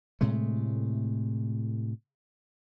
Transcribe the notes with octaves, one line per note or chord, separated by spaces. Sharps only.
A2 C3 G#3 A3